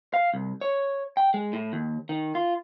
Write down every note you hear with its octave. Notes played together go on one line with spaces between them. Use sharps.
F5
C2
C#5
G5
G#3
A2
D#2
D#3
F4